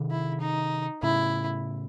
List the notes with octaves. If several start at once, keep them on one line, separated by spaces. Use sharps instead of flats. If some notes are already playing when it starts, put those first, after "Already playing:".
Already playing: C3 D#3
E4
D#4
A2 C#3 E4